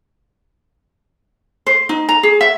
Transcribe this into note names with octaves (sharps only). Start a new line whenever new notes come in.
C5
D#4
A#5
G#4
E5